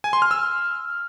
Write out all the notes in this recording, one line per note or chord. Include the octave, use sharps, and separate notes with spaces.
G#5
C6
F6
E6